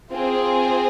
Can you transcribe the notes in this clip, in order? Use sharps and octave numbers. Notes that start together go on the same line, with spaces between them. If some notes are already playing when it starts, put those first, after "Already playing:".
C4 F4 G#4 C5